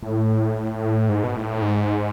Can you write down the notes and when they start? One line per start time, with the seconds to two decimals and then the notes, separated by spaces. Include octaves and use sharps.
0.03 A2
1.09 G#2
1.24 B2
1.36 A2
1.62 G#2